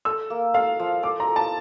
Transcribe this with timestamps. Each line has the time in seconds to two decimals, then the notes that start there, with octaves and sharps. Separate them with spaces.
0.05 A4 E6
0.30 A#3
0.54 A4 F5
0.79 F3
1.03 A4 D6
1.20 A#5
1.28 A4
1.36 A5